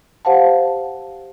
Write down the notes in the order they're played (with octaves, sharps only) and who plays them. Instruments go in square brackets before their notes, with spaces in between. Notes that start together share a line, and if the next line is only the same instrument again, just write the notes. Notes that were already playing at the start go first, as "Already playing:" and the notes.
[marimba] G4 C5 F5 F#5 A5